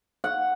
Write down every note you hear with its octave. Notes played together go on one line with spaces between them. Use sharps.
F#5